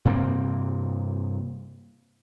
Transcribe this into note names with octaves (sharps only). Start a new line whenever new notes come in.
G2 C3 A#3 C4